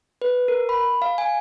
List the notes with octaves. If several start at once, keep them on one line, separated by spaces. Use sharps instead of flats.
B4
A#4
B5
F5
G#5